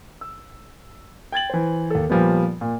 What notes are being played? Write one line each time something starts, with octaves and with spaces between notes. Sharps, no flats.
E6
G5 G#6 A6 F#7
E3 C5
D#2 A4
A#2 F3 G3 B3
A#2